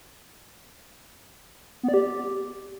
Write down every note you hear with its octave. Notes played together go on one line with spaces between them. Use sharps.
B3
D5
G4